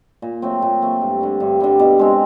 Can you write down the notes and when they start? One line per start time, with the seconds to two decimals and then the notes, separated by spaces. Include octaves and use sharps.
0.22 A#2
0.42 F#3 A3 C4
0.62 A#2
0.82 F#3 A3 C4
1.01 G2
1.21 D3 G3
1.40 G2
1.60 D3 G3
1.80 B2
1.99 G#3 C4